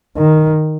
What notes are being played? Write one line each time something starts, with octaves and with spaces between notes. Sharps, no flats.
D#3